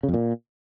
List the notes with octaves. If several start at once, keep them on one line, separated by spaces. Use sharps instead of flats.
C#3
F2
A#2